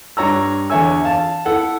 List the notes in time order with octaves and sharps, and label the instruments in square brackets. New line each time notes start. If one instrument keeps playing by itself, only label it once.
[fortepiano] G2 C#5 A#5 E6
E2 D3 C#5 E5 G#5 E6
F5 A5
E4 A4 F#5